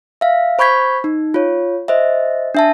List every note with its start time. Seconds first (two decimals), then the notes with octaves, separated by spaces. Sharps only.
0.21 E5 F5
0.59 C5 B5 C#6 G6 G#6 B6
1.04 D#4
1.34 F4 C#5
1.88 C5 D#5 E5
2.55 D4 E5 A5